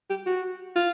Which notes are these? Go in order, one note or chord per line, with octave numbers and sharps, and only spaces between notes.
G4
F#4
F4